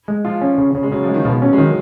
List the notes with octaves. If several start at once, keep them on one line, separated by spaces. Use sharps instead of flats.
G#3
F3 F4
F3 C#4
C#3
C#3
G#3
C#3 F#3
F3
G#3
D#3
B2 F3
F#3 C#4
G#3
D#3 F#3